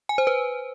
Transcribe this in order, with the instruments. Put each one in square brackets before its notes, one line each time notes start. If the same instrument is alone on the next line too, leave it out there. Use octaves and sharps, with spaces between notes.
[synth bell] G#5
C5
B4